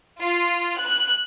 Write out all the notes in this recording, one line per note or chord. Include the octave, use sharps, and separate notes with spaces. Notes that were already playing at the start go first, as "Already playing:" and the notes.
F4
F#6